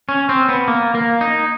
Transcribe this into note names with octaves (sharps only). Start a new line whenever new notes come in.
C#4
C4
B3
A#3
A#3
D#4